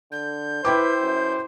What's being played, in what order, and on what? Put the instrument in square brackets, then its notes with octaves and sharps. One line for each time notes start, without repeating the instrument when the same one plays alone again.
[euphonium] D3 [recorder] G6
[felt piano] E4 G5 D6 [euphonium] B4 [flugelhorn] C5
[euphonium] F#2